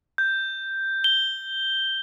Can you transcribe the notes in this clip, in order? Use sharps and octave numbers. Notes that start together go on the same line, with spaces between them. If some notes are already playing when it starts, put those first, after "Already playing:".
G6
G7